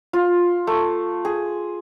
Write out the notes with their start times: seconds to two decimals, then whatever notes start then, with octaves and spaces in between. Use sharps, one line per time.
0.13 F4
0.67 A3
1.25 G#4